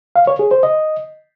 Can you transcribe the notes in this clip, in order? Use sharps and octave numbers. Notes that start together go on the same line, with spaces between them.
F5
C#5
G#4
C5
D#5